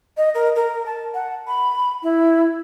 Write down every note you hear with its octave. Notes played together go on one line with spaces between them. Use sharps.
D#5
A#4
A#4
A5
F#5
B5
E4